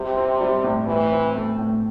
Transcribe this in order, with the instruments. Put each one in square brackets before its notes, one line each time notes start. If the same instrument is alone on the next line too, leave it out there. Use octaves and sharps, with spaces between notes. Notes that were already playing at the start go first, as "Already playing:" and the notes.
Already playing: [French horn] C3 [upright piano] G3 G4
[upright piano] C4
G3
A2
[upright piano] A2 [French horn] E3
[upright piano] C4
A3
A2